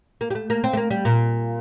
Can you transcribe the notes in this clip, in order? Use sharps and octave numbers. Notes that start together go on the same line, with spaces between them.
A#3
G3
A3
A#3
C4
A3
A#3
G3
A#2